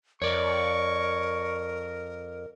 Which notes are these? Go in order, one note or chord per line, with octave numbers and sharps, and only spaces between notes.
F2 A#4 C#5 D5 C#6